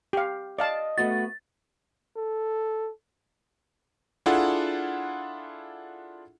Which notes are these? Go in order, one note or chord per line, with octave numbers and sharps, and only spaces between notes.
G4 F5
D5 D#5 F5 A5
A3 B3 F#4 A6
A4
D4 E4 F4 G#4 A4 F#5